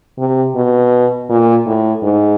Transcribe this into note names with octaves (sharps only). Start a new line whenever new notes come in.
C3
B2
A#2
A2
G#2